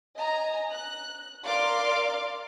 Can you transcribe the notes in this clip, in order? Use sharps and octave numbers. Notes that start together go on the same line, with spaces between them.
D#5 G#5 A#5
F#6
A#4 D5 F5 C6 D6 F6